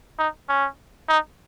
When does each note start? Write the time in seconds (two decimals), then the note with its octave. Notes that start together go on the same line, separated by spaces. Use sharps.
0.18 D#4
0.49 C#4
1.08 D#4